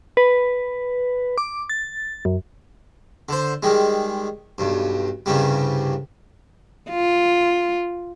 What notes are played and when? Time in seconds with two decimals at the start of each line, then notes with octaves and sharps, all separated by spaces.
0.17 B4
1.38 D6
1.70 A6
2.25 F#2
3.29 D3 C5
3.63 D#3 G3 G#3
4.58 B1 G2
5.26 C2 G2 C#3 G3
6.90 F4